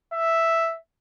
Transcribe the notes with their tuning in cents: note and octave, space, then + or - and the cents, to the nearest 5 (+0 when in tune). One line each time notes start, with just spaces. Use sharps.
E5 +0